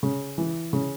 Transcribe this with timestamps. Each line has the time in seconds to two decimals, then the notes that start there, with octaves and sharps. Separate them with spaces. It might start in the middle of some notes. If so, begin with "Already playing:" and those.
0.03 C#3
0.38 E3
0.73 C#3